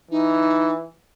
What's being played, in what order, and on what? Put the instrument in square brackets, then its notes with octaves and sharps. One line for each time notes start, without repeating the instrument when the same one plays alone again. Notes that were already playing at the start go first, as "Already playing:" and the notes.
[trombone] E3 [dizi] D#4